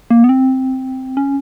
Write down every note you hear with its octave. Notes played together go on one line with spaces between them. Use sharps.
A#3
B3
C4
C#4